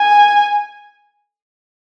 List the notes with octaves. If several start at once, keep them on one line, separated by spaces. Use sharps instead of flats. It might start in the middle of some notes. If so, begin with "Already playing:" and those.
Already playing: G#5